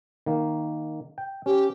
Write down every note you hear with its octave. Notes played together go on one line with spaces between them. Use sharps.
D#3 A#3
G5
C#4 G4